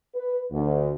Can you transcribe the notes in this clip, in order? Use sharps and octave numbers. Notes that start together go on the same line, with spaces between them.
B4
D2